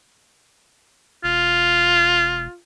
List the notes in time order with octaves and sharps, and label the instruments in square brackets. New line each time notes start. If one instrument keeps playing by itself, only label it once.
[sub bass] E1 [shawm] F4